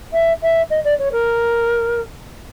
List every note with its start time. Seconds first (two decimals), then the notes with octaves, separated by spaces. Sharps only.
0.13 E5
0.42 E5
0.70 D#5
0.84 D5
0.99 C#5
1.12 A#4